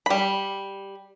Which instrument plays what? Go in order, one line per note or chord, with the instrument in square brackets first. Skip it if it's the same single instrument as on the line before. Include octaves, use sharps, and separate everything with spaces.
[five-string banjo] G3 B5